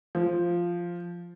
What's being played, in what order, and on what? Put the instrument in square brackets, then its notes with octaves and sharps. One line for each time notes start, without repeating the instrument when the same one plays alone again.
[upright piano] F3